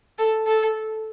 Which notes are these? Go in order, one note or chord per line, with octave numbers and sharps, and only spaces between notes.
A4
A4